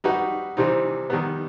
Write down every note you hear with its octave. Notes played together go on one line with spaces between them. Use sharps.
G3 D#4 F#4 B4
C3 E3 G3 C4 D#4
D#3 G3 B3